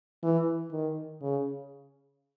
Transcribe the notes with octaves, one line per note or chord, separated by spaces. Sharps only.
E3
D#3
C#3